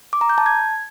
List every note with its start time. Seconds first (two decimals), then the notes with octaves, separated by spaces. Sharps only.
0.13 D6
0.21 A#5
0.29 G6
0.38 A5
0.46 G#6